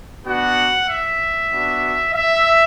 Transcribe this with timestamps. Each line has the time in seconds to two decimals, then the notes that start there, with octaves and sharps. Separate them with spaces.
0.25 B3 D4 F#4 F#5
0.88 E5
1.50 B3 D4 F#4
2.13 E5